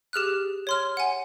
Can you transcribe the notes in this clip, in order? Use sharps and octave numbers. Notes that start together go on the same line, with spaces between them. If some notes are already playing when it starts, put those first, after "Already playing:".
G4 G#4 F6 F#6
C#5 C6 F6
F#5 G#5